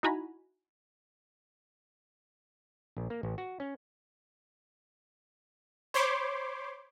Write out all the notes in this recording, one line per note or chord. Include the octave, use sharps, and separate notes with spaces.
D#4 E4 F#4 G#5 A#5 B5
A#1
A#3
A1
F#4
C#4
C5 C#5 B5 C6 D6